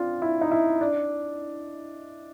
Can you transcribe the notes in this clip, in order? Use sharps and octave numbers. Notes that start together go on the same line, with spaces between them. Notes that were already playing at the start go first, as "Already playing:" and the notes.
Already playing: C4 D4 F4
E4
D#4
E4
D4